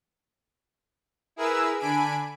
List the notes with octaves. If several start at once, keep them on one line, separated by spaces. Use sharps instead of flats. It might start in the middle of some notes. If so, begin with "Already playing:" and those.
E4 G#4 A#4 B4 E6
D3 D4 G#5 B5 D7